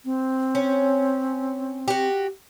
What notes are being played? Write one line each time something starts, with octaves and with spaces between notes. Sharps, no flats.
C4
C#4
F#4 G4